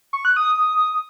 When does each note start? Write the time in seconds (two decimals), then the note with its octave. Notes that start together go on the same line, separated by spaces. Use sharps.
0.13 C#6
0.25 F#6
0.36 D#6